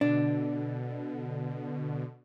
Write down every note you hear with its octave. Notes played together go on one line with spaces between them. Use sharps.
B2 D3 D4